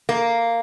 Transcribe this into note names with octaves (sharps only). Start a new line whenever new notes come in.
A#3